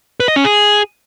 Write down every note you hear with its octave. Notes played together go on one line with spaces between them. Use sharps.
B4
D#5
C#4
G#4